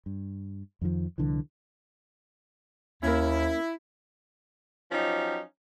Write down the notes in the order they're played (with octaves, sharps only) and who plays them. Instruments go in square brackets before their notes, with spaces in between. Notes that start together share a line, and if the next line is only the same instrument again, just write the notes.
[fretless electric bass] G2
F2 D#3 F3
C2 D3 E3
[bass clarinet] D#2 [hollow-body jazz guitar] A#3 C#4 [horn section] E4
[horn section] F3 F#3 C#4 D#4 G4